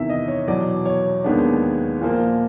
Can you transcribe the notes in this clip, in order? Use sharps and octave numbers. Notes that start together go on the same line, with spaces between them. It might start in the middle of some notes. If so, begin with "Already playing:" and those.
Already playing: E2 C3 D#3 E5
D#5
C#5
E2 B2 F#3 D5
C#5
D#2 D#3 G#3 B3 D4
A#2 F3 A#3